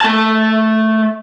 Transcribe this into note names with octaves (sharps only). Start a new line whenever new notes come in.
A3 A5